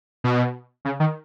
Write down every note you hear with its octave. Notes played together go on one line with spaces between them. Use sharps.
B2
C#3
D#3